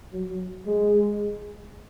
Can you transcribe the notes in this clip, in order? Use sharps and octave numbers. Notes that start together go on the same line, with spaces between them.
F#3
G#3